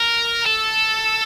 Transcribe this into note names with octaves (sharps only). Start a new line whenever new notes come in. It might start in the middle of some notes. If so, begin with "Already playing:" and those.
Already playing: A#4
A4